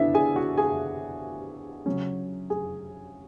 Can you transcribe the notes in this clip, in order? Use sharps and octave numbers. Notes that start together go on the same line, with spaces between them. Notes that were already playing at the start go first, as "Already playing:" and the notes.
Already playing: D3 B3 D4 E4 E5
G#4 G#5
F#4 F#5
G#4 G#5
C#3 F#3 C#4
G#4 G#5